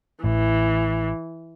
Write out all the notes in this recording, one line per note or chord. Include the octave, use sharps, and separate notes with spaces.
A1 E3